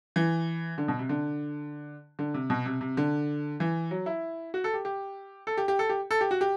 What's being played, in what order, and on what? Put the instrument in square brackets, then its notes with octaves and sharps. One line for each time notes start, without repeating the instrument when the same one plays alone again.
[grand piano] E3
D3
B2
C3
D3
D3
C3
B2
C3
C3
D3
E3
F#3
E4
F#4
A4
G4
G4
A4
G4
G4
A4
G4
A4
G4
F#4
G4